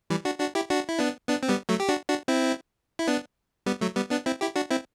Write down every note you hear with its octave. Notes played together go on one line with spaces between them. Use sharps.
E3 G3
D4 F#4
D4 F#4
E4 G4
D4 F#4
E4
B3 D4
B3 D4
C4
G3 B3
F#3 A3
G4
D4 F#4
D4 F#4
C4 E4
E4
B3 D4
G3 B3
F#3 A3
G3 B3
B3 D4
C4 E4
E4 G4
D4 F#4
C4 E4